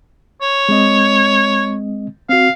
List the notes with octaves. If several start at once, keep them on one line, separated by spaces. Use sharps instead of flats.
C#5
G#3 C4 D#5
C4 F#4 F5